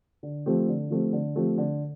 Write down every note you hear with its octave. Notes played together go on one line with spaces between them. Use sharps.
D3
F3 A3 C4 G4
D3
F3 A3 C4 G4
D3
F3 A3 C4 G4
D3